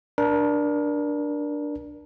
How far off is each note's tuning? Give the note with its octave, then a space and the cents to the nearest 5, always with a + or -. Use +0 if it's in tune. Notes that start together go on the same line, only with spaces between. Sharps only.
D4 +0 A#4 +30